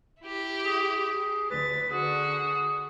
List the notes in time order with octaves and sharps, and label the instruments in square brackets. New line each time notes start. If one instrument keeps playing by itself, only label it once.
[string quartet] E4 G4
[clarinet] G#4
[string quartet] D2 A6 [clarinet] B4
[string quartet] D3 F#4 [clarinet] G#4